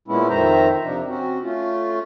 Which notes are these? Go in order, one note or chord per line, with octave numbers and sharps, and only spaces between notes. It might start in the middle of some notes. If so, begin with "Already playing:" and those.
A#2 G#3 B3 C#4 E4
F2 D#3 C5 E5 A#5
C3 F3 D4 D#4
C4 C#4 F#4
A3 C#4 F4